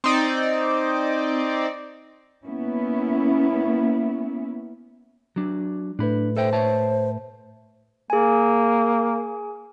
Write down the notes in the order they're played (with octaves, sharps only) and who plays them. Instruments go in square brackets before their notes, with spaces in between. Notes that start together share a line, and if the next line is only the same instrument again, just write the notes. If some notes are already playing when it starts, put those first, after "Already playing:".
[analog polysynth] C4 D#4 D5
[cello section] A#3 B3 C#4 E4
[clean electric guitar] F#3 D4
[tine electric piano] A2 A3 B4 [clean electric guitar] D4 B5
[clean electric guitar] A4 E5 G5 [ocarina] C5
[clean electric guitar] C#5 E5 A5
[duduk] A#3 [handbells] G#4 G#5